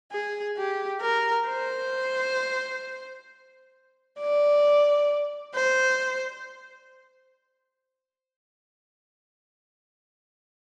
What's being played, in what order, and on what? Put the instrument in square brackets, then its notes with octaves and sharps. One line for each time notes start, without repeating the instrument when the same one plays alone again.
[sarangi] G#4
G4
A#4
C5
D5
C5